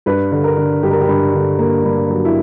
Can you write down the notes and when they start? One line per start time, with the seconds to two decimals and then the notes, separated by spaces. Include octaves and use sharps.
0.06 G2 B4
0.32 D3
0.44 A#4
0.57 D3
0.83 G2 G4
0.91 A#4
1.01 G4
1.08 G2
1.34 D3
1.59 A#3
1.84 G2
2.10 F#3
2.25 E4